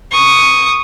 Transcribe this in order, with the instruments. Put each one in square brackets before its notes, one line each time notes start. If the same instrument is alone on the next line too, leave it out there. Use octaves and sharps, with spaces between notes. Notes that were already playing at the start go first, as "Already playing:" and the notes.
[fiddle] C#6 D#6